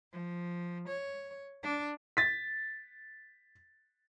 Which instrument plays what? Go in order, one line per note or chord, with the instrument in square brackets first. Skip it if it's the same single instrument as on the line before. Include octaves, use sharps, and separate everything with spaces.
[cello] F3
C#5
D4
[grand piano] A6 B6